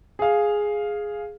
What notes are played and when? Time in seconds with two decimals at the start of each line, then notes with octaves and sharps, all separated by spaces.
0.19 G#4 F5